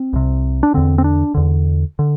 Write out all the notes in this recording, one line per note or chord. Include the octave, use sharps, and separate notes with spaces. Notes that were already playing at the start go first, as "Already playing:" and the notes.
Already playing: C4
C2 C3
D4
E2 D3 C4
C4
D4
E2 D3
D3